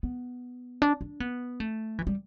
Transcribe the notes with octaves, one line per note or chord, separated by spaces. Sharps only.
B3
D4
D4
B3
A3
E3
G3